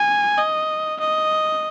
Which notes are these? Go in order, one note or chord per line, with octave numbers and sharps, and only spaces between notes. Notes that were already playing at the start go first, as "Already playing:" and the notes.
Already playing: G#5
D#5
D#5